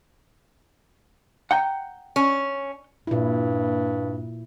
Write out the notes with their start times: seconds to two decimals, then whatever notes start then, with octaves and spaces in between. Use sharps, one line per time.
1.51 F#5 G5 A#5
2.16 C#4
3.07 G2 A#2 E4